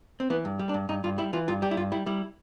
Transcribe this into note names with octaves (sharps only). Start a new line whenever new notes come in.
C4
E3 B3
G2
G3
D4
G2
G2 D#4
G2 F4
G3 E4
E3 F4
G2 F4
G3 G4
E4
G2 F4
G3 E4
G3 E4